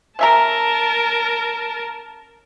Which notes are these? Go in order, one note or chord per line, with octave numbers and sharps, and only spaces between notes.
C#4 A#4 E5 A5 A#5